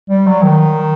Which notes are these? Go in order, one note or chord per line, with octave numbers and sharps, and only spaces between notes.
G3
F#3
D#3